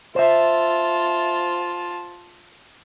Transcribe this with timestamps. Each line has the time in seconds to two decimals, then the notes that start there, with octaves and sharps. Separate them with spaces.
0.16 F4 C5 E5 A5